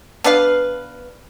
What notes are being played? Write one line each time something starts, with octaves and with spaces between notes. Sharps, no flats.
B3 D4 B4 F5